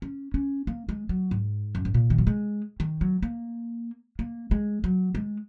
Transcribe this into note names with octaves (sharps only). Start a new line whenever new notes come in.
C#4
C#4
A#3
G#3
F#3
G#2
F#2
G#2
A#2
D#3
F#3
G#3
D#3
F#3
A#3
A#3
G#3
F#3
G#3